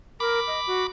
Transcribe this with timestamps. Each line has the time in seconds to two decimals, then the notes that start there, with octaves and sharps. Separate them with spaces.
0.20 A#4 B5 D6
0.47 D#5
0.67 F#4